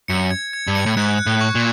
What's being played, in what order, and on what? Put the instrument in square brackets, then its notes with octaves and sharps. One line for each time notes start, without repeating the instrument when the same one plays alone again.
[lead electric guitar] F#2 [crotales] C#7
[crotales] G#6
G#6
[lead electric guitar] G2
[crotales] C#7
[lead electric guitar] A2
[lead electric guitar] G#2 [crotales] F#6
[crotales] F#6
[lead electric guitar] A2
[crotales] C#6
[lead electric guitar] A#2